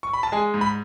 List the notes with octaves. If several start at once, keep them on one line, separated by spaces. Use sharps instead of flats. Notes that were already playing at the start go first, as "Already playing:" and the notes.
C#6
B5
A5
G#3 G#5
G#2
B5